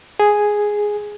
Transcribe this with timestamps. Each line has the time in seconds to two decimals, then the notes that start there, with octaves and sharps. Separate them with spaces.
0.20 G#4